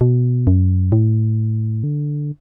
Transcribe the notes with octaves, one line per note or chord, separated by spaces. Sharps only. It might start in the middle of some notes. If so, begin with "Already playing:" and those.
B2
F#2
A2
D3